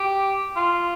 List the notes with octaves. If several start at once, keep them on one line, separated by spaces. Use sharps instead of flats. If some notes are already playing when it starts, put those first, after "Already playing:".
Already playing: G4
F4